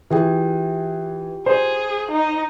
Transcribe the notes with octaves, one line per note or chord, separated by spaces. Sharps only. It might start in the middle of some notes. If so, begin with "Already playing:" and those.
E3 F4 G4 G#4 G5
G#4 C5
D#4 D#5